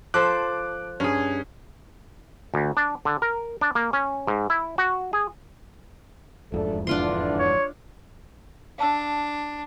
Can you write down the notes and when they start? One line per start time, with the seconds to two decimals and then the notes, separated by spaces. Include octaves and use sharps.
0.14 F3 A4 C5 D6 F#6
1.00 G2 C#4 G#4
2.54 D2
2.77 D4
3.05 D3
3.22 A#4
3.61 D4
3.75 A#3
3.93 C#4
4.27 G#2
4.50 E4
4.78 F#4
5.13 G#4
6.52 E1 F2 G#2 A3 D4 A4
6.87 D3 E3 D4 F4 C6
7.39 C#5
8.78 D4 F5 A5 E6